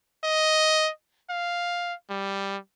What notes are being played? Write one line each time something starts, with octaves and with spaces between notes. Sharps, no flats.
D#5
F5
G3